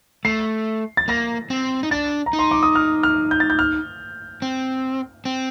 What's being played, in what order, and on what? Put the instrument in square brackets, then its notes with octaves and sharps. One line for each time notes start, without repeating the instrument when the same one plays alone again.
[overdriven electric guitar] A3 [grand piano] C7
[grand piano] A6
[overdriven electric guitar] A#3 [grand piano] A#6
[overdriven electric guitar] C4
D#4
[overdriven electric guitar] D4 [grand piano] A6
[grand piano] A#5
[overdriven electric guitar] D#4
[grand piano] C6
D6
D#6
F6
F6
G6
A6
G6
F6
[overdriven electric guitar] C4
C4